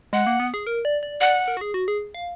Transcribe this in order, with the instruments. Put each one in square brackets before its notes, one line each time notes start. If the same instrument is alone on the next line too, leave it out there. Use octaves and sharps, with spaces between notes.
[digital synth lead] G#3 [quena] F#5
[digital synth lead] A#3
B3
G#4
A#4
D5
D5
[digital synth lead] D5 [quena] F#5
[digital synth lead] A#4
F#4
G#4
F#4
G#4
F5